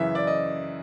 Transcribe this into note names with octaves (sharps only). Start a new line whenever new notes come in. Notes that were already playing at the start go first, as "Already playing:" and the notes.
Already playing: F#2 C#3 E3 E5
D5
D#5